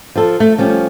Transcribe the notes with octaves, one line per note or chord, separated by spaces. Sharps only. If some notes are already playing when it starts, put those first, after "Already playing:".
F3 A4
A3
F3 G3 C#4